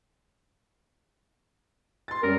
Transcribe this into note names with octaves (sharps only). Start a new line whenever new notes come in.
C6 A6
F#2 G3 A#4